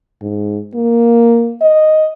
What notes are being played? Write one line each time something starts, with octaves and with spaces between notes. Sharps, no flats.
G#2
A#3
D#5